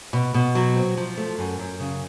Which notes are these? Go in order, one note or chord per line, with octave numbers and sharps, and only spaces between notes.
B2
B2
F#3
C4
F3
A3
F#2
F#2
C#3